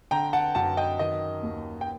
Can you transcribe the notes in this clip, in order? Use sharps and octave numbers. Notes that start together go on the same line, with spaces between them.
D3 G5 A#5
F#5 A5
F#2 F#5 A5
D#5 G5
D#3 D#5
D#2
G5